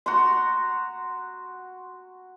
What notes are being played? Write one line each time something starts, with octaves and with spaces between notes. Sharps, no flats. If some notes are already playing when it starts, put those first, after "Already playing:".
F#4 A#5 C6